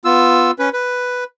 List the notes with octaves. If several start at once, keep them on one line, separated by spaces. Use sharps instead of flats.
B3 F4 E6
C#4 B4
B4